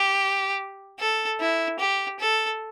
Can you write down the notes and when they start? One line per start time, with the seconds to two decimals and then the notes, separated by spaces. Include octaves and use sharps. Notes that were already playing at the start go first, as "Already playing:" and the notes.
Already playing: G4
1.00 A4
1.40 E4
1.80 G4
2.20 A4